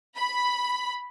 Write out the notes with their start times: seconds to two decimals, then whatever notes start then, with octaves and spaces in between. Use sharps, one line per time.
0.17 B5